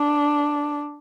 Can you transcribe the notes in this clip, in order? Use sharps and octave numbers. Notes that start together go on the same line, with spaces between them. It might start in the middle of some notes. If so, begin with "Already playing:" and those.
Already playing: D4